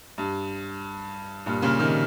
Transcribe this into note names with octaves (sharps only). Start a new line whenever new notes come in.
G2
G2 A#2
A#2 C#3
C3 D#3